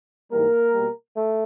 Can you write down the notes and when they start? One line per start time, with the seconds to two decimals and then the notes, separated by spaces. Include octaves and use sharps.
0.32 G#2 E3 G3 A#3 A#4
0.74 B2 G3
1.15 A3